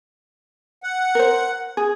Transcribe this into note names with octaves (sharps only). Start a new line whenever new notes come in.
F#5
A#4 C5
G#4